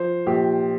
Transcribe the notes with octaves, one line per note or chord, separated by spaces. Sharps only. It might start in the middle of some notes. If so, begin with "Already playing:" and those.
Already playing: F3 C5
A#1 G4